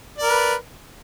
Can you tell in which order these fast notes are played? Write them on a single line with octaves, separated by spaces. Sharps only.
D5 A#4 B4